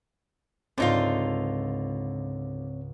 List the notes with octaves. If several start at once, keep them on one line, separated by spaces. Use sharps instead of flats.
C#2 G#2 D3 C4 D#4 F4 C#5